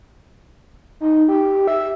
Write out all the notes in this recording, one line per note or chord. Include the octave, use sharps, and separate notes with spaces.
D#4
G4
E5